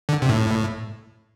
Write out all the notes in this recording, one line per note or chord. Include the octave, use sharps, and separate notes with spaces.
D3
C3
A2